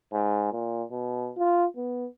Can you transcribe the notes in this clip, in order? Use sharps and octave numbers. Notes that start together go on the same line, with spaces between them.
G#2
A#2
B2
F4
B3